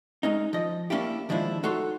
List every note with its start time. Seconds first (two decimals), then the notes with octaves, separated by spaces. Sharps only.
0.23 G#3 C#4 D#4
0.53 F3 D#5
0.90 A#3 C#4 D4 E4 G4
1.29 D#2 F3 G#3 D4 E4
1.63 D#4 F#4 A4 C#5 C6